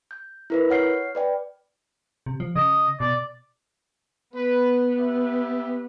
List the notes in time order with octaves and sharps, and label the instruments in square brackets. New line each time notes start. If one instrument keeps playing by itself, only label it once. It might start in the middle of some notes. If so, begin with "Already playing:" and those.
[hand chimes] G6
E4 A#4 B4
C#5 F#5 F6 C7
B4 D5 G5
[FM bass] C3
F3
[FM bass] C#3 [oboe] D#5
[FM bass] B2 [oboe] D5
[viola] B3 [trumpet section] B4
[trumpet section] G4 E5